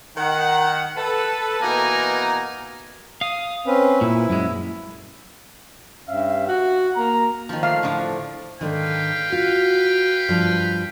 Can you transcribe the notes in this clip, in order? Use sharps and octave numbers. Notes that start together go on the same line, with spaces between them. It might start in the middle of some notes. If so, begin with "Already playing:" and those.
D#3 F#5
A4 B4
B2 E3 A#3 D#4 G#5 A#5
F5 D#6
C4 C#4 B4
A#2 E4
F#2 G#3
G2 C#4 E5 F5
F#4 F#5
A#3 A#5
D#3 F3
A3 F5
A2 D3 F3
G#2 D3 D#3 B4 F5 G5
F4 F#4
G2 F3